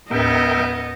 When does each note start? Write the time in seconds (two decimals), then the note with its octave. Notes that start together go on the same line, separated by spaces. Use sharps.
0.11 D#2 A2 B3 A#4 D#5 E5 G5